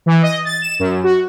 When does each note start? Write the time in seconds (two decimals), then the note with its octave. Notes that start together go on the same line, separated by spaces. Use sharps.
0.06 E3
0.22 D#5
0.45 A6
0.62 E7
0.79 F#2
1.04 F#4